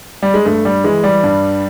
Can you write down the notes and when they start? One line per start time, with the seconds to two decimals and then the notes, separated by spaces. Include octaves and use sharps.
0.22 G3
0.34 G#3
0.45 G2 A3
0.65 G3
0.84 E3 G#3
1.04 G3
1.23 G2